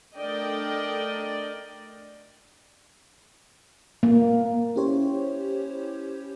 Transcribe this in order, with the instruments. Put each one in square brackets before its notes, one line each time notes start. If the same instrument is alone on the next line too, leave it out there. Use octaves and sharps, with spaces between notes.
[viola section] A3 D4 A#4 D5 D#5 G5
[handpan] A#3
[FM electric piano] C#4 E4 G4 C5 C#5